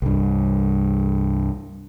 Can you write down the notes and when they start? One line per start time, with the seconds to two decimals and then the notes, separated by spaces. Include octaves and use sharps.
0.02 C2 G2